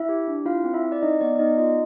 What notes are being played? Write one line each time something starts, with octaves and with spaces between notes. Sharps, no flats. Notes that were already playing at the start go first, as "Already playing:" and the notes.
Already playing: E4 E5
G4
D4
E4 F4 F5
C4
E4 E5
C4
D5
D#4 D#5
B3 D5
D5
B3 D#4 D#5
D#4 F4 D#5